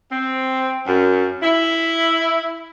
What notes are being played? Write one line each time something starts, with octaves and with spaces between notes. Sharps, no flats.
C4
F#2
E4